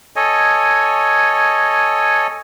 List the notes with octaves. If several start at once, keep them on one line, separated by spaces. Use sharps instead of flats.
A4 C#5 D#5 G#5